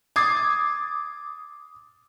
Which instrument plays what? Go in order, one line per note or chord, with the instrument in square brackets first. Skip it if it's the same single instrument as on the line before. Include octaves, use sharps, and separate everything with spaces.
[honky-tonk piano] D6 D#6 G#6 A6 C7